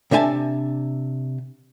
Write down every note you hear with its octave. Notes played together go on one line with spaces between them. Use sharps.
C3 D4 E5 G#5 A5